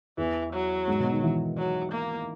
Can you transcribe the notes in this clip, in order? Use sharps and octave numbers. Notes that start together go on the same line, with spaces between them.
E2 E3
F#3
G#2
B2
D#3
E3
F#3
A#3